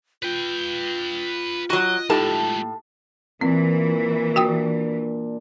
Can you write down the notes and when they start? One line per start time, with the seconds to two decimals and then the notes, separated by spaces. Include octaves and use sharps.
0.23 F4 B4 G5
1.70 F#3 F#4 D#5
2.10 A2 G#3 A3 D#4 G4 A4 A5
3.41 A#2 E3 C4
4.36 D4 F#4 G5 D#6